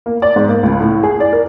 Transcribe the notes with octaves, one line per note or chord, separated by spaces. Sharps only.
A#3
D5
G#2
A#3
C#2
A2
G#4
D5
A#4